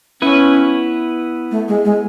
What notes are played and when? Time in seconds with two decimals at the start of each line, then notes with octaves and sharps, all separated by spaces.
0.22 B3 C#4 E4 B4
1.51 A3
1.68 G#3
1.85 G#3